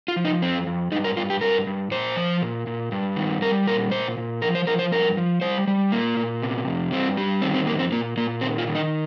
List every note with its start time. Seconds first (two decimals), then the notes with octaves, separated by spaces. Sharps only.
0.08 F4
0.16 F3
0.25 D#4
0.42 F2 C4
0.67 F2
0.91 G2 D#4
1.04 A#4
1.17 G2 F4
1.30 G4
1.41 G2 A#4
1.67 G2
1.91 A#2 C5
2.16 F3
2.41 A#2
2.67 A#2
2.92 G2
3.16 D#3
3.42 G3 A#4
3.67 A#2 A#4
3.91 A#2 C5
4.18 A#2
4.42 F3 A#4
4.55 C5
4.67 F3 A#4
4.79 C5
4.91 G2 A#4
5.17 F3
5.41 G3 C5
5.68 G3
5.92 A#2 A#3
6.17 A#2
6.42 C3
6.67 F2
6.92 G2 C4
7.17 G3
7.42 D#3 C4
7.54 C4
7.66 F2 A#3
7.79 C4
7.92 A#2 A#3
8.17 A#2 A#3
8.41 D#3 C4
8.58 F4
8.67 D#3
8.75 D#4